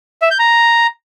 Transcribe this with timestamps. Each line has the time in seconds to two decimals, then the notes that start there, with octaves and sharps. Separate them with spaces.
0.22 E5
0.31 G6
0.39 A#5